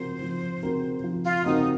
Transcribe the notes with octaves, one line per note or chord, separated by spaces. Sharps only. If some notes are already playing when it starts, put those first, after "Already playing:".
Already playing: F3 C4 F#4 A#4 C5
F3
C4 F#4 A#4
F3
F4
C4 D#4 F#4 A#4